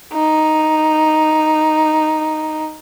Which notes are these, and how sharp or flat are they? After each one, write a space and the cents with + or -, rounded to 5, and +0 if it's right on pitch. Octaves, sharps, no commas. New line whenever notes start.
D#4 +0